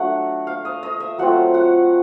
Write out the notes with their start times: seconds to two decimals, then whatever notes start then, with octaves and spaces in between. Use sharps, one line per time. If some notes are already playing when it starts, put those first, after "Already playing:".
Already playing: F#3 A3 D4 F#5
0.47 F5
0.65 D#5
0.83 D#5
1.00 E5
1.18 F#3 A3 C4 F4 F#5
1.54 F#5